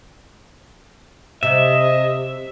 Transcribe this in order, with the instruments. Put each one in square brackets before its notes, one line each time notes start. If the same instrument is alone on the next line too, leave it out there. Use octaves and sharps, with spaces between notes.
[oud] C3 [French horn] D#5 [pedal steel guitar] E5